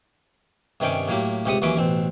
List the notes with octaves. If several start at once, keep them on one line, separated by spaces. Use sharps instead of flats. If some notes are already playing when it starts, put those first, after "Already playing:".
G2 C3 D#3 C#4 G5 D6
A2 F#3 A#3 G4
C#2 C3 G4 F#5 C6 D#6
D#2 E3 F#3 C#4 B4 D6
A1 B2 C4